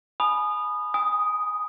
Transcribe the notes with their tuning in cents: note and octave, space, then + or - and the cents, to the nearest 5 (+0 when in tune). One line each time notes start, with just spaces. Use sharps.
G#5 +25 B5 -5 D#6 -20
G#5 -25 D#6 +0